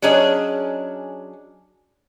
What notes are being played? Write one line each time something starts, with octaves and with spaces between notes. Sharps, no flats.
F#3 C#4 D4 G#4 D#5